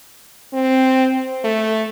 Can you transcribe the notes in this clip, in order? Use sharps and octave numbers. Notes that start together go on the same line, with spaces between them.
C4
A3